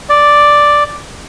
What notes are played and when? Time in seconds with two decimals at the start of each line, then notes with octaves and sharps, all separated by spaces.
0.09 D5